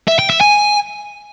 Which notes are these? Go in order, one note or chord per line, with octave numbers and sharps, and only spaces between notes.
E5
G5
E5
G#5